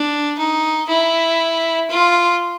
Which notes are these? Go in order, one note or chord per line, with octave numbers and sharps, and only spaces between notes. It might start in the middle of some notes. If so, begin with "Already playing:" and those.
Already playing: D4
D#4
E4
F4